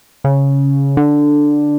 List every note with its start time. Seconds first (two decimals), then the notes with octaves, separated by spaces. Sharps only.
0.24 C#3
0.97 D3